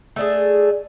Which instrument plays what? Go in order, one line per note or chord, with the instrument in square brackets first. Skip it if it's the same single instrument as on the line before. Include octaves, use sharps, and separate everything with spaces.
[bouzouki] A3 D4 G#4